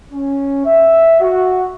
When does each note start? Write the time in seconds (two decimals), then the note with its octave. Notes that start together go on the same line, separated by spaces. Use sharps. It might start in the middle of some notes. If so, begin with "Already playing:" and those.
0.13 C#4
0.66 E5
1.21 F#4